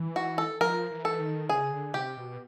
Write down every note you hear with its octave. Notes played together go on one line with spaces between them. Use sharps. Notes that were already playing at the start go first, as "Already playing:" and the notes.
Already playing: E3
F#4
A4
F3 A#4
E3
A4
D#3
C#3 G#4
D3
C3 G4
B2